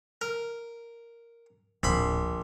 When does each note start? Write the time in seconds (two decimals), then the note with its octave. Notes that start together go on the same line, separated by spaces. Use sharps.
0.21 A#4
1.83 D1 A#1 B5 C6